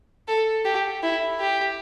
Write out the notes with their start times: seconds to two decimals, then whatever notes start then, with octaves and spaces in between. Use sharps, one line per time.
0.28 A4
0.65 G4
1.03 E4
1.39 G4